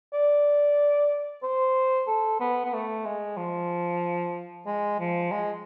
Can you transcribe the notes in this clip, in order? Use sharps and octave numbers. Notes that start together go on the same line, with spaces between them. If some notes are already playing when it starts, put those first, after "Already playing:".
D5
C5
A4
B3
B3
A3
G#3
F3
G#3
F3
G#3